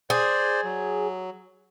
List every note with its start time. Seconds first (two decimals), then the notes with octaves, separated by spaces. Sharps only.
0.10 G#4 C5 D5
0.64 F#3